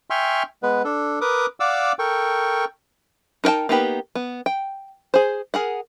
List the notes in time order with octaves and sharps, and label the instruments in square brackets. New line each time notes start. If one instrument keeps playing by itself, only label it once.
[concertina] E5 G5 G#5 C6 C#6 F6
G#3 B3 B4
D4 A4
A#4 B4 D6 D#6
D5 F5 F#5 D6 E6
A4 A#4 G5 C#6
[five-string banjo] D#4 A#4 B4 G5 A5
A#3 B3 D#4 G4 B4
B3
G5
G#4 C5
G#4 A#4 F#5